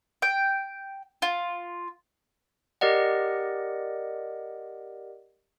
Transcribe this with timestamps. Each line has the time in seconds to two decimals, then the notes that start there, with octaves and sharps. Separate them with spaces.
0.22 G5
1.22 F4
2.81 G4 A#4 D5 D#5 F#5